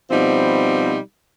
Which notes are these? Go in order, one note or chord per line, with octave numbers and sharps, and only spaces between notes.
B2 F3 G3 C4 D#4